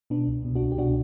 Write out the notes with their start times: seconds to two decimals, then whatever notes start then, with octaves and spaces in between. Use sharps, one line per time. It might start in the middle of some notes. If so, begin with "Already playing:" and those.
0.10 B2 B3 D4
0.27 C2
0.45 B2
0.55 D4 F#4
0.62 C2
0.72 G4
0.78 B2 D4 F#4